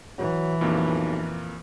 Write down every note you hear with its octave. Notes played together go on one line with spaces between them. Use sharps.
E3 F#3
B1 F2 A#2 A#3